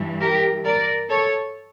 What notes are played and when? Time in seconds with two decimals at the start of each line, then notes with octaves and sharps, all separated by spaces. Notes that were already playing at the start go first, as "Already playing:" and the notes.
Already playing: G2 E3 G3
0.21 G4 A#4
0.65 A#4 D5
1.09 A4 C#5